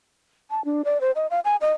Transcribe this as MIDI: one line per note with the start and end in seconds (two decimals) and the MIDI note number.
0.50 0.64 81
0.65 0.82 62
0.85 1.00 74
1.01 1.11 72
1.15 1.27 75
1.30 1.40 77
1.45 1.56 80
1.61 1.72 75